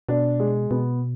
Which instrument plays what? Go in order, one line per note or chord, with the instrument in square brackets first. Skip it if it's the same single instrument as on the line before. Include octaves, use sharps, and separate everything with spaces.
[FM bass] B2 [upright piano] D4
[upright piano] G#3
[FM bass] B2 [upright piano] B3